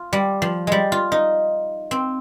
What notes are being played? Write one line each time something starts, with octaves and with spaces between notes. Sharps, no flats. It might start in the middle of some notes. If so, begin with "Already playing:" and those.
Already playing: F4
G3
F3
G3 G#3
F4
D#4
C4